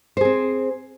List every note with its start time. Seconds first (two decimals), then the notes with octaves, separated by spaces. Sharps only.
0.17 C5
0.21 G#4
0.25 C4